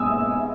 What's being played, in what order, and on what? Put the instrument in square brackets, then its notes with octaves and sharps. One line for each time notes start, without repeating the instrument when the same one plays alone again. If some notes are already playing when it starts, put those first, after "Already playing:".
Already playing: [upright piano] G#3 B3 G#5 D#6 E6